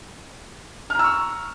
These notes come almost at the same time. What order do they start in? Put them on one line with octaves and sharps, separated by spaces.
F6 A#5 E6 C#6